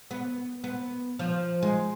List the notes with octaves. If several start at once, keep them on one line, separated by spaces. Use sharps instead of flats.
B3
B3
F3
G#3